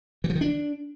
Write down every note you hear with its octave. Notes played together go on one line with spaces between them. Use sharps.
E3
F3
D#3
D4